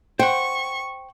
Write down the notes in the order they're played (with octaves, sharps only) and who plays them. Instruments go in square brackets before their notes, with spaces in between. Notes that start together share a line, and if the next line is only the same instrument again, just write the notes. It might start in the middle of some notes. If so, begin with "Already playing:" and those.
[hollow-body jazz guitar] C5 F#5 [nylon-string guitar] G5 [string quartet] C#6